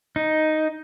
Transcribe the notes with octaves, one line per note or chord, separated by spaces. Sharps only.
D#4